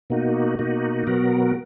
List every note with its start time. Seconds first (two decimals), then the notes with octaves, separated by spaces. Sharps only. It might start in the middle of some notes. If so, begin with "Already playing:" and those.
0.10 B2 A#3 D#4 F#4
0.59 B2 A#3 D#4 F#4
1.07 B2 F#3 B3 F#4 A#4